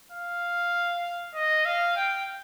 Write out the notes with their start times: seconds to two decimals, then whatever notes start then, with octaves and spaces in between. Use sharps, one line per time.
0.12 F5
1.35 D#5
1.65 F5
1.96 G5